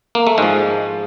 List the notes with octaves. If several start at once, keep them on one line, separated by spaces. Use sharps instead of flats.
A#3
A3
G#2 F3 G#3